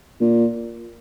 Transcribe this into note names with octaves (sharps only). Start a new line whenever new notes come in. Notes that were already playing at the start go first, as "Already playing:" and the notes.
A#2